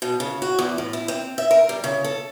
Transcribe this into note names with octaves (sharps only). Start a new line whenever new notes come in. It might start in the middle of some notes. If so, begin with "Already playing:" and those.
B2
C#3
F#4
E2
A2
E4
C4
E5
A#4
G3
C#3
A4